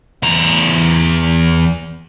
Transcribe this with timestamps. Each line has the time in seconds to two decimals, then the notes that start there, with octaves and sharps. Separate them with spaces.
0.23 E2 A#5